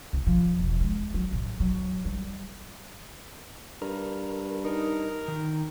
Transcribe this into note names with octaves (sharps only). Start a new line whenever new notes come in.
C#2
F3
E1
G#3
F#3
A1
F#3
G3
G2 A#4
D#4 A#4
D#3